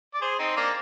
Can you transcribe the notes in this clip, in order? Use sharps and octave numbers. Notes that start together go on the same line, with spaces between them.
D5
G#4 C5
C4 D#4
A#3 D4